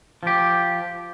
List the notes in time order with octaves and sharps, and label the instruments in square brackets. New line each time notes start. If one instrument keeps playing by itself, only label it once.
[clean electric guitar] F3 G4